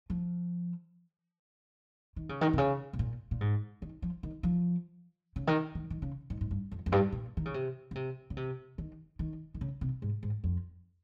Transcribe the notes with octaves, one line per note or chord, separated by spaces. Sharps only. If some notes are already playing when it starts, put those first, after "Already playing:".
F3
D#3
C#3
D#3
C3
C#3
C3
A#2
A#2
G#2
D#3
F3
D#3
F3
C#3
D#3
D#3
D#3
C#3
G#2
G#2
G2
F2
F2
G2
A#2
D#3
C#3
C3
C#3
C3
C#3
C3
D#3
D#3
D#3
C#3
C3
G#2
G#2
F2